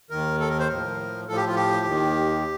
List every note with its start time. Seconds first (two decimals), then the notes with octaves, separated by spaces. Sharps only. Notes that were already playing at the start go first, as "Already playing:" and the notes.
0.10 D#2 D#3 A#4
0.40 A4
0.49 A#4
0.59 C5
0.68 A2 F3 A#4
1.28 A2 F3 A4
1.36 G4
1.47 F4
1.56 G4
1.86 D#2 D#3